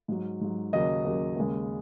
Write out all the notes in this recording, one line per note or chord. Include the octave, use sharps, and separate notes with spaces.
G#2 F#3
G#2 F#3
D#2 C#3 F#3 D#5
D#2 C#3 F#3
D#2 C#3 G#3